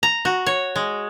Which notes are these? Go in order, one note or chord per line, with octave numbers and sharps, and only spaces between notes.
A#5
F#4
C#5
G#3